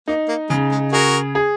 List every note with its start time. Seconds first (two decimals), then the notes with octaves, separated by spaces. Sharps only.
0.08 A#3 D#4
0.28 A#3
0.49 C#3 G#3
0.72 G#3
0.92 F#4 G#4 A#4
1.35 G#4